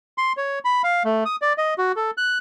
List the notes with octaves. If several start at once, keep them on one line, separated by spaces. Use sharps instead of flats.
C6
C#5
B5
F5
A3
D#6
D5
D#5
F#4
A4
F#6